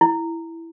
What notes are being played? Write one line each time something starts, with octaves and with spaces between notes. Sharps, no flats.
E4